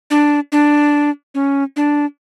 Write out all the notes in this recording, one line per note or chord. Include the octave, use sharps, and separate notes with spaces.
D4
D4
C#4
D4